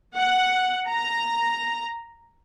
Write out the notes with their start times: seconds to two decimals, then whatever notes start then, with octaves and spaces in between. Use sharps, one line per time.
0.15 F#5
0.89 A#5